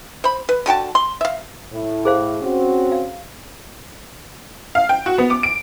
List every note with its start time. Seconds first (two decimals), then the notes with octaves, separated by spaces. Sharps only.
0.24 C5 B5
0.49 B4
0.66 D3 F#4 G5 A5
0.95 C6
1.21 E5 F5
1.72 A2
2.05 G#4 C5 F5
2.42 C4 C#4 F#4
2.92 F5
4.75 F5
4.89 G5
5.06 F#4
5.18 B3
5.30 D6
5.43 D7